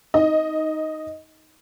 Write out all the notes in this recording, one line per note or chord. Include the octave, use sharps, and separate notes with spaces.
D#4 D#5